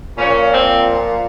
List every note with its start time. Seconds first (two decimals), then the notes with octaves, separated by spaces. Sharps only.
0.17 A#2 F3 C#4
0.52 C4